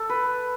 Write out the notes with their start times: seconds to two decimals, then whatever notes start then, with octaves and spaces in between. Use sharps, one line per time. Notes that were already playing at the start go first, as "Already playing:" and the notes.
Already playing: A4
0.09 B4